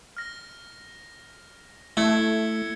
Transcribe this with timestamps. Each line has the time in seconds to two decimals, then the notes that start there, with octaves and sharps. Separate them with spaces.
0.17 F6 A#6
1.97 A3 E4 G#6 C#7 G7